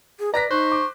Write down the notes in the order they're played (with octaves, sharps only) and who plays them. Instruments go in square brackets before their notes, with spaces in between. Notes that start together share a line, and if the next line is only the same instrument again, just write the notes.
[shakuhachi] G#4
[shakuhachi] B4 [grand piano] D5 A#6 B6 [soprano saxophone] A#5
[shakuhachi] D#4 [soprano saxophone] C5 [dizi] C#6 [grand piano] F#6
[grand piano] D6